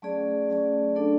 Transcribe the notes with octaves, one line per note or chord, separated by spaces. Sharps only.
F#3 A3 C#4 G#4 D5
F#3 A3 C#4 G#4 D5
A3 D4 A4 D5